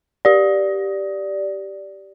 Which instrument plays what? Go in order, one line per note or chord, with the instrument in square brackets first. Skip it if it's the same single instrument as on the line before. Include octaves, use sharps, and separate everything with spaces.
[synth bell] G4 D5